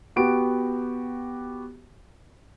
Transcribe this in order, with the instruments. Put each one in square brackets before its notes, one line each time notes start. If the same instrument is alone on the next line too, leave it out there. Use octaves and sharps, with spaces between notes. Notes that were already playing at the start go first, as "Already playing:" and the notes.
[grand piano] B3 F#4 G4 D7